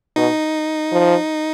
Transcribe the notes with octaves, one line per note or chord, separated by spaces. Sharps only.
B2 D#4
F3